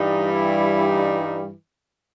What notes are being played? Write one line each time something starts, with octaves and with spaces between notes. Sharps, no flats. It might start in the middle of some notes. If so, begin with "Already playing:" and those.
Already playing: G2 E3 G3 D#4
E4
D#4